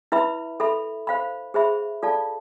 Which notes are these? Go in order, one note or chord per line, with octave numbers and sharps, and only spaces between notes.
E4 B4 E5 B5
A4 E5 B5
C5 F5 B5
G#4 C5 E5 B5
F4 A4 D5 F5 A5